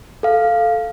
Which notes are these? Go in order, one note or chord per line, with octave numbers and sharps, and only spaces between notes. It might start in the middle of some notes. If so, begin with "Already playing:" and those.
A4 F5